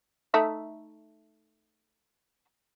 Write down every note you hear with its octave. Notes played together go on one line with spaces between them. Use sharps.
A3 D#4 E5